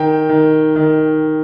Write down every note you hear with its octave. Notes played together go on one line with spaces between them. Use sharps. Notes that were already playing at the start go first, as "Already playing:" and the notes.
Already playing: D#3 G5
D#3
D#3